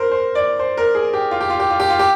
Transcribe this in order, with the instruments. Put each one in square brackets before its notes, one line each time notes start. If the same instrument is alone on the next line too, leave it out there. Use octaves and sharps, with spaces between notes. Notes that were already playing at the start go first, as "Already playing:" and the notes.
Already playing: [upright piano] A#4 C5
C5
D5
C5
A#4
G#4
G4
F4
G4
F4
G4
F4
G4
F4
G4